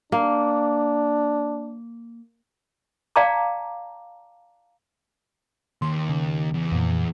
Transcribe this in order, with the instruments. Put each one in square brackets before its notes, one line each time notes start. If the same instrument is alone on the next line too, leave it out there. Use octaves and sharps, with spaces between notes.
[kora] A#3 [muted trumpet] D4
[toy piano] D5 F5 G5 A5 A#5 D6
[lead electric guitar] D#2 [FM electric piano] C6
[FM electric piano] C#3
[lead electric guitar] E2
[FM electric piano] F2 A#2